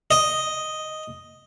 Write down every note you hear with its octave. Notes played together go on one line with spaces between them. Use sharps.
D#5